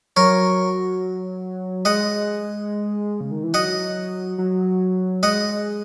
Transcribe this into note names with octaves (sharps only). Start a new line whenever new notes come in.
F#3 A#4 C#5
G#3 D#5 F#5
C#3
D#3
E3
F#3 D#5 F#5
F#3
G#3 D#5 F#5